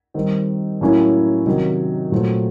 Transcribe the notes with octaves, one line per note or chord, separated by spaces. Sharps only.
D#3 G3 C4
A2 F#3 A#3 C#4 E4
C3 D#3 F#3
A#2 F#3 A3 C4 F4